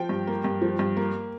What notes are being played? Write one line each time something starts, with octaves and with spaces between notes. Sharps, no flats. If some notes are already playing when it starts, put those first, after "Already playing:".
Already playing: F3 G5
G2
A#3
G2
F3
G2
A#3